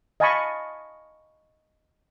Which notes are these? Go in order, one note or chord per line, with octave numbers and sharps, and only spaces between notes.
D#5 F5 G#5 A5 B5 C#6